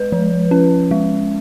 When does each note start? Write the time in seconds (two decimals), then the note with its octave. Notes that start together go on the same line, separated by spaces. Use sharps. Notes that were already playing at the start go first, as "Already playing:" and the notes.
Already playing: G#3 B4
0.12 F3
0.51 C#4
0.91 G#3